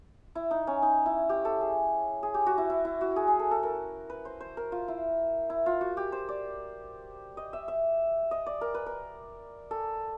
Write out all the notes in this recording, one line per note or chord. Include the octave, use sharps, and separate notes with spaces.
E4
D#4
C#4
D#4
E4
G4
A4
G#4
G#4
G4
F#4
E4
E4
E4
F#4
G#4
G#4
A4
A4
A#4
B4
C5
C5
A#4
F4
E4
E4
F4
F#4
G4
C5
D5
D#5
E5
E5
D#5
D5
A#4
B4
A#4
A4